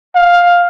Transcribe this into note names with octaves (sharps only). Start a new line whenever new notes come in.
F5